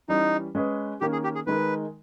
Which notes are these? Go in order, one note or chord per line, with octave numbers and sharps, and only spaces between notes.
E3 G3 C#4 D#4
G#3 C#4 G#4 B4
D#3 A#3 C#4 G4
G#4
G4
G#4
D#3 G#3 D#4 A#4 B4